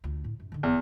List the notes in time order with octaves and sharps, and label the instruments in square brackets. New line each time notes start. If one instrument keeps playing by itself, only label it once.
[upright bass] D2 F4
A2
F#2
D3 D#3
[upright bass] F1 [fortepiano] E2